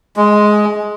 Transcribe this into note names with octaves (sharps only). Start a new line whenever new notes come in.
G#3